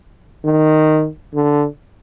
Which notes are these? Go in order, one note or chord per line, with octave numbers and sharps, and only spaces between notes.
D#3
D3